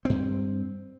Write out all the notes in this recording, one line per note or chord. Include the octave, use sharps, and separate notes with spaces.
G2 C4